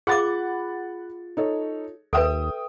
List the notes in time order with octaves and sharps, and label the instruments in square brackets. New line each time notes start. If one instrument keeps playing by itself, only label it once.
[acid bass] F4 [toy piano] G#4 D6 [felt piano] F#5 B5 A6
[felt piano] D#4 A4 C#5
[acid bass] D#2 [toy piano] A4 B4 [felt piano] E5 G5 D#6